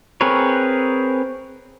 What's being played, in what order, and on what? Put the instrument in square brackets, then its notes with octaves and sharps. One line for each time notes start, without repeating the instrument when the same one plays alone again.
[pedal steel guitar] C4 G#4 A#4 B4 C#5